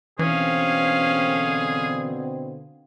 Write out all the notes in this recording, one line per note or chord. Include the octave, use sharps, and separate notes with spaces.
B2 D3 E3 C4 C#4 G#4 F5